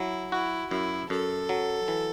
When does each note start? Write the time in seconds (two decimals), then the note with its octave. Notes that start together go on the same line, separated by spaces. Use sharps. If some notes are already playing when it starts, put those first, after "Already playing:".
Already playing: F#3 E4
0.32 E4 F#4
0.71 F#2 E4
1.10 F#2 A4
1.49 F#3
1.88 E3